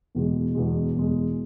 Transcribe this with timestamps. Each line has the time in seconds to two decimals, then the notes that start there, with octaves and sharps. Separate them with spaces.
0.15 E2 B2 G#3
0.55 E2 B2 G#3
0.94 E2 B2 G#3